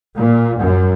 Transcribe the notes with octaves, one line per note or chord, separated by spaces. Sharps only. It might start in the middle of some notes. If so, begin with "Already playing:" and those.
A#2
F#2